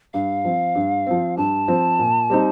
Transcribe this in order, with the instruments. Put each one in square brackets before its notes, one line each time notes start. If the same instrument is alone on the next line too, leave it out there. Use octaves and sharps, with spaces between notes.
[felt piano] G2 [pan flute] F5
[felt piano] F3 C4
G2
F3 C4
[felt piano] G2 [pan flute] A5
[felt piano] F3 C4
A#2
G3 C4 D#4